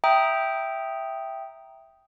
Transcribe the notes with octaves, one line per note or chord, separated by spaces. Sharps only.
E5 G5 A#5 D#6